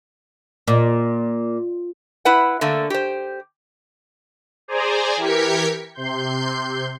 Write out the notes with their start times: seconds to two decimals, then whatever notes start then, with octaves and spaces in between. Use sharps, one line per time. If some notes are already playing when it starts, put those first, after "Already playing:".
0.68 A#2
2.25 E4 B4 F#5
2.61 D3 A3 A#3
2.90 G4 C5
4.68 G#4 C5 D5 G#5 A#5
5.17 E3 G4 A#4 G#6 B6 C#7
5.94 C3 C6 G6